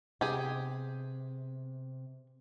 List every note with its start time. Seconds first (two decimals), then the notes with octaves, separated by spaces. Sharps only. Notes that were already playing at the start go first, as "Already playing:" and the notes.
0.21 C3 B3 G4 G#4